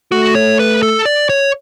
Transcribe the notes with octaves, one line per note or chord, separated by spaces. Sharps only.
A3 F#4
C#5
B4
A4
D5
C#5